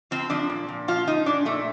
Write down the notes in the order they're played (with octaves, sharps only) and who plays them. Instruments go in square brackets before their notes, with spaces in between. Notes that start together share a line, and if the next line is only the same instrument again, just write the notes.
[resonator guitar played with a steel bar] F3 C4
F3 D4
A#2
A#2
F3 F4
F3 D#4
A#2 D4
A#2 A3